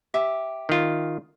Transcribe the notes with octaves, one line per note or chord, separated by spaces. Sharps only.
G4 E5 D6
D#3 F4